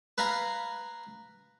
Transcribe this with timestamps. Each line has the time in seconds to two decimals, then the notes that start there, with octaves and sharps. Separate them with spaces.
0.18 B4 F5 G#5 A#5